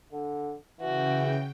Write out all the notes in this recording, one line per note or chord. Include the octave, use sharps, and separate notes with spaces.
D3
C#3 E3 F#4 G5